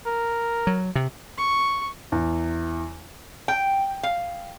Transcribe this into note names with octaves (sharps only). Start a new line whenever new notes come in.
A#4
F#3
C3
C#6
E2
G5
F5